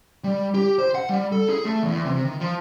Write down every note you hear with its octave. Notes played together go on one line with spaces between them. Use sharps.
G3
G4
C5
F#5
G3
A4
G#4
A3
E2
C3
D#3
F3